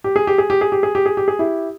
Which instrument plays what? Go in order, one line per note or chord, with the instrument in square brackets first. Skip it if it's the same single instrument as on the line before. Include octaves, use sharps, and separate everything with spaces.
[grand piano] G4
G#4
G4
G#4
G4
G#4
G4
G#4
G4
G#4
G4
G#4
E4 G4